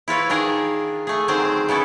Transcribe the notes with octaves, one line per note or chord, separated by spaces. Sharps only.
E4 F4 B4 C#5
D#3 D4 G#4 A#4
A3 G#4
D3 D#3 F#3 C4 G#4 C5
C#3 B3 E4 A4